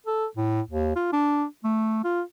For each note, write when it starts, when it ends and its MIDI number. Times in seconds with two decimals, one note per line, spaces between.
0.06 0.25 69
0.37 0.61 45
0.70 0.93 39
0.96 1.09 65
1.12 1.45 62
1.64 2.01 57
2.04 2.22 65